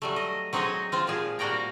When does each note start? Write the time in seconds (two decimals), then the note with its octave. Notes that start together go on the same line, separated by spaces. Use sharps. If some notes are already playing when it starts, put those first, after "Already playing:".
0.02 F#3 G3 A3
0.16 D#5
0.53 F#3 C4 D#4 G#4 C#5 D#5
0.92 C4 F4 C5
1.07 A#2 F3 G4 G#4
1.39 G3 A#3 F#4 D5 G5 A#5